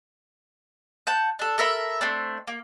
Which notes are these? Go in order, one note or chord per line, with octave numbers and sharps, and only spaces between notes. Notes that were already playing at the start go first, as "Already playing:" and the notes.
F#5 A5 G6
D4 A4
A4 A#4 E5 B5
A3 C4 D4
A#3